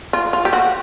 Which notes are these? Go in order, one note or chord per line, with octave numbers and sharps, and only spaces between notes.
F4
F4
G4
F#4